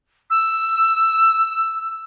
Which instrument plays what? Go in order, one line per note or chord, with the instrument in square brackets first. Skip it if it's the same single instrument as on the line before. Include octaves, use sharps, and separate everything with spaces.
[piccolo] E6